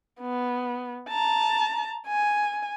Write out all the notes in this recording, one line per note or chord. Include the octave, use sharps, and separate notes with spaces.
B3
A5 A#5
G#5